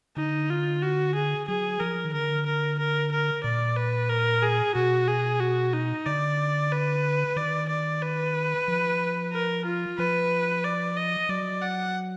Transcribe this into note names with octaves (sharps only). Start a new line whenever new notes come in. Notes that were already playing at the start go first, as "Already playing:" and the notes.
D3 D#4
F4
F#4
G#4
F#3 G#4
F3 A#4
D#3
D3 A#4
A#4
A#4
A#4
A#2 D5
B4
A#4
G#4
B2 F#4
G#4
F#4
D#4
D3 D5
B4
D#3 D5
D5
B4
F3
A#4
F4
F3 B4
D5
D#5
F#3 D5
F#5